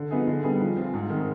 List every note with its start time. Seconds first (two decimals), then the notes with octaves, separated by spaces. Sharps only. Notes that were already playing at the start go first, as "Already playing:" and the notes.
Already playing: D3
0.11 F3 B3 D#4 G#4
0.27 D3
0.43 G3 B3 D#4 G#4
0.60 F3
0.77 C4 F4
0.94 G#2
1.10 D#3 G#3